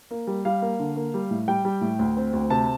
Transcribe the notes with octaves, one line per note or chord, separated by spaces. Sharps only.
A#3
G3
G3 F5
A#3
D3
A#3
G3
A2
G3 G5
G3
A2
D2
C4
D2
C3 A5